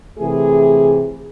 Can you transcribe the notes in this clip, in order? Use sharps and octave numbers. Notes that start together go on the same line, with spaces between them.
C3 E3 A3 G#4